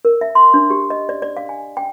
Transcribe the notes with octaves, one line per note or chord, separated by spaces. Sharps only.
A#4
E5
C6
D4
G4
D#5
D5
D5
F5
G#5
G5